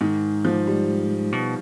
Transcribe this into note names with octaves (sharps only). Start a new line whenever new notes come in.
G#2 D#3
F3
G3
B2